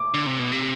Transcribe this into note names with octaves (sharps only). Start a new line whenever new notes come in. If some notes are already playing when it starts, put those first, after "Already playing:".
Already playing: D6
D3
C3
B2
C3